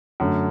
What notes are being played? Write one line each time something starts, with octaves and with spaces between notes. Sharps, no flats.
F#2 D3 A3